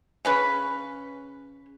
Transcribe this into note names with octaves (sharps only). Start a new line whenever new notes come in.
C#3 C#4 B4